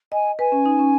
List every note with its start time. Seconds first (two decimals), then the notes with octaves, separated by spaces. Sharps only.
0.12 D#5 G#5
0.39 B4 G#5
0.52 C#4
0.66 D#4
0.79 C#4